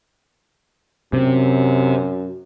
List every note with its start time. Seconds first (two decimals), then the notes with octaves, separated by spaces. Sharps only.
1.13 F#2 C3